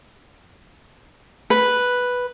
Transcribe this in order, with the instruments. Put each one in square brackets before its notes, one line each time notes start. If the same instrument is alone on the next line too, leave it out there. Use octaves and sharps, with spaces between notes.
[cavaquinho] B4